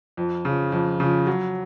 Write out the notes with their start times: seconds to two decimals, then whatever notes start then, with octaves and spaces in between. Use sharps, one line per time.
0.17 F2
0.45 C#3 F3
0.72 F2
1.00 C#3 F3
1.27 F#3